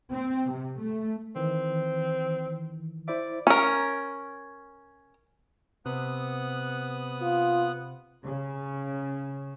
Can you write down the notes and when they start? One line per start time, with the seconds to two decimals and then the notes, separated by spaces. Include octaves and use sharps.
0.11 C4
0.50 C3
0.80 A3
1.36 D#3 E3 C4
3.08 E4 C5 D5 E5
3.47 C#4 A#4
5.86 C3 B3 D#6 F#6
7.21 F4
8.23 C#3